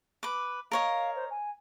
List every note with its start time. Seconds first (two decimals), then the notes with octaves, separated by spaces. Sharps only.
0.23 B4 D6
0.72 A#4 C#5 D#5 F5
1.16 C5
1.30 G#5